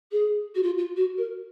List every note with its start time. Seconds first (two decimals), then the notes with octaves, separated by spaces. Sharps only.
0.12 G#4
0.55 F#4
0.62 F4
0.77 F4
0.96 F#4
1.17 A#4